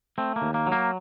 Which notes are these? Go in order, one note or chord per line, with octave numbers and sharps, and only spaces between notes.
A3 C4
A#3
D#2
A#3
F#3
A#3